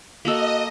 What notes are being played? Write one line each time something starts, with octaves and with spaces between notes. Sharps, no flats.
A#3 F#4 A4 D#5